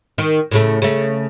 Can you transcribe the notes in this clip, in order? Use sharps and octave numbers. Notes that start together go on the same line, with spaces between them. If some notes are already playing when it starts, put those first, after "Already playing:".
D#3
A2 C#3 A3
C#3 A3